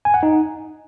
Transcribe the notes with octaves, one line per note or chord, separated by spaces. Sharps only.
G#5
F#5
D#4